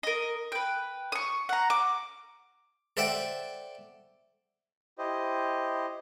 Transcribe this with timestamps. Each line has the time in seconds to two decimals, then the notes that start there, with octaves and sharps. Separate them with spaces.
0.03 A#4 D#5
0.52 B4 G5
1.12 C#6 D#6
1.49 F#5 A#5
1.70 D6
2.97 A4 C5 D5 E5 F#5 G5
4.98 E4 G4 C5 D#5